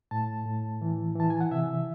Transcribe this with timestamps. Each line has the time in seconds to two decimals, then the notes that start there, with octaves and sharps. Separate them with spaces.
0.11 A2 A5
0.46 A2
0.81 E3
1.16 E3 A5
1.30 G#5
1.41 F#5
1.51 C3 E5